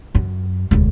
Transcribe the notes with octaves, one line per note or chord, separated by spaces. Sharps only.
F#2
E1 D2